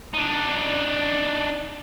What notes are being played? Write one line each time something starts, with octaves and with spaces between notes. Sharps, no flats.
D4 D#4